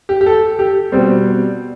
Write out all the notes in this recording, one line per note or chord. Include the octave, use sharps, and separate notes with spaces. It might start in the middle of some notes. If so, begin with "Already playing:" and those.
G4
G4
A4
G4
B2 G3 C4